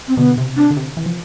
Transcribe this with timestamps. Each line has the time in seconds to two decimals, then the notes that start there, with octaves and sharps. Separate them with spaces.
0.08 C4
0.17 B2 D3 B3
0.38 C3
0.57 C3 D4
0.71 D3
0.77 C3
0.97 E3
1.06 F3